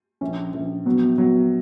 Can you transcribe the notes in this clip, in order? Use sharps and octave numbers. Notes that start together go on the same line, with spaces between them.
A#1 C#4
A#1
F#3 B3
F#3 B3